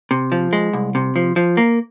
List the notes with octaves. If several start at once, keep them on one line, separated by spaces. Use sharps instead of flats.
C3
F3
G#3
C2
C3
F3
F3
A#3